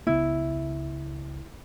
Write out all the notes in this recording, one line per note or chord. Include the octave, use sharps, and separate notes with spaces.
C#2 C#3 B3 E4